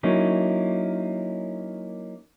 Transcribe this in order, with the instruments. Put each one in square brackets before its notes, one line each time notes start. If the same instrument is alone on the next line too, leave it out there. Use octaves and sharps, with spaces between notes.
[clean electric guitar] F#3 A#3 C#4 D#4 E4